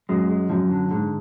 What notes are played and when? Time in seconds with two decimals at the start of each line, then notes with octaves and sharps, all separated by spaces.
0.09 F#2 G#3
0.30 G#3
0.50 F#2 F3
0.71 D3
0.91 G#2 D3